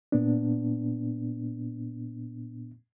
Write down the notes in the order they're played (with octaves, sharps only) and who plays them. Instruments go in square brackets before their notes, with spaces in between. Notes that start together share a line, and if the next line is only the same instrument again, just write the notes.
[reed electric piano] A#2 B3 D4